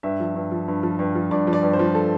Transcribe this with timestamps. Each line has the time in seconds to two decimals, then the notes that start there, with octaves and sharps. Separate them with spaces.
0.03 G2 E5
0.20 F3
0.35 G2
0.51 F3
0.68 G2
0.83 F3
0.99 G2
1.15 F3
1.31 G2 D5
1.47 F3
1.53 D5
1.63 G2
1.73 C5
1.79 F3
1.95 A4